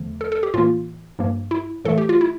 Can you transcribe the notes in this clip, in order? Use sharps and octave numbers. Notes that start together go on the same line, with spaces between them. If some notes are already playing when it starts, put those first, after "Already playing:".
Already playing: E2 D3 F3 A3
A4
A4
G4
A2 E3 A#3 F4
G2 F3 A#3
E4
A2 E3 A3 A4
G4
F4
E4